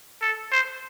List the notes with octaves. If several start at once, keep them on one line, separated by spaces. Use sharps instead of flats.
A4
C5